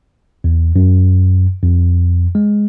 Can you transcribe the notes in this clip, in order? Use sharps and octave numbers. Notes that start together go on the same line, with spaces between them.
E2
F#2
F2
G#3